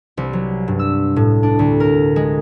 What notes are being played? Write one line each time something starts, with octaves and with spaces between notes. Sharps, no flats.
C2
F#3
G2
E6
A2
D4
D2
A#4
G#3